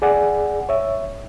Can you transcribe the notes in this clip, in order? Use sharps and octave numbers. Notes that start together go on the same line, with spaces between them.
G#4 D5 F#5 G#5
C#5 E5